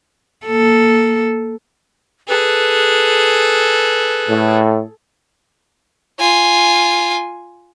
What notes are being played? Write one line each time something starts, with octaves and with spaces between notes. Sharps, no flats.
A#3 A4
G#4 A4 B4
A2
F4 G#5